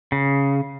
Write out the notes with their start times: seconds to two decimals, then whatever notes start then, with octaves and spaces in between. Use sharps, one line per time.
0.12 C#3